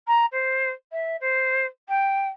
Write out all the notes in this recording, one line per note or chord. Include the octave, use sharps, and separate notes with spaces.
A#5
C5
E5
C5
G5